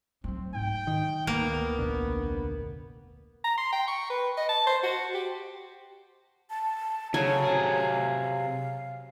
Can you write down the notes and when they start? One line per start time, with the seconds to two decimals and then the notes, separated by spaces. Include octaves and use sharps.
0.24 F#3 A3 C4
0.54 G#2 G5
0.87 D#3
1.27 D2 A#3 B3
1.78 F1 A#1 D3
3.44 A#5
3.58 C6
3.73 G5
3.88 C#6
4.10 B4
4.37 D#5
4.49 A5
4.67 C5
4.84 F#4
5.14 G4
6.50 A5
7.14 C#3 F#3 A4 C#5 G#5
7.44 C3 G#4
7.72 F5